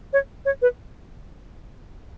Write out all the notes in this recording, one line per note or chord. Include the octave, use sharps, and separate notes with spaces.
C#5
C#5
B4